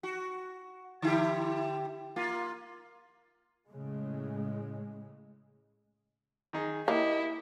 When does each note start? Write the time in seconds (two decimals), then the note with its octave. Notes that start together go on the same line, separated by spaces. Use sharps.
0.03 F#4
1.02 D3 E4 G4
2.16 A#3 F4
3.68 A2 C#3 G#3
6.53 D#3 D#4 G#4
6.88 A#3 E4 G4 D#5